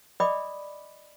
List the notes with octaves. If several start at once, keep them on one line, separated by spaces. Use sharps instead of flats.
D5 D#5 G5 B5 D6 D#6